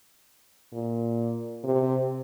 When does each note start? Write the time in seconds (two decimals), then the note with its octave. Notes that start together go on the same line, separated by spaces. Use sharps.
0.73 A#2
1.64 C3